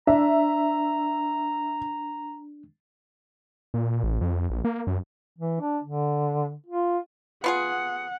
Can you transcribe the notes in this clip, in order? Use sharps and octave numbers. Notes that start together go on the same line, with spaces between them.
D4 E5 A#5
A#2
A1
F2
A#1
A#3
F#2
E3
D4
D3
F4
B3 F4 G#4 F#5